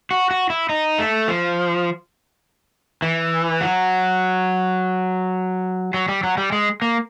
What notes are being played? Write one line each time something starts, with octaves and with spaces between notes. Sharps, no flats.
F#4
F#4
E4
D#4
A3
F3
E3
F#3
F#3
G3
F#3
G3
G#3
A#3